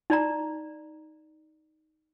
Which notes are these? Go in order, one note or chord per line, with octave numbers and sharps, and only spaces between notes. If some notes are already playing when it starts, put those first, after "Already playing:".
D#4 D5 A#5